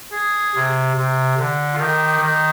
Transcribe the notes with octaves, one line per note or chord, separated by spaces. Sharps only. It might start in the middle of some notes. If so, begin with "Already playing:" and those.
G#4
C3
C3
D3
F4
D#3 G4
D#3